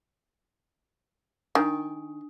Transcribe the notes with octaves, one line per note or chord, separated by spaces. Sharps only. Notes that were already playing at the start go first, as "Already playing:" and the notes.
D#3 D4 G#5 D#6